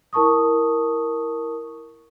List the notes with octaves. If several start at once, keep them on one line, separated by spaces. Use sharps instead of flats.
E4 A#4 A5 C#6 D#6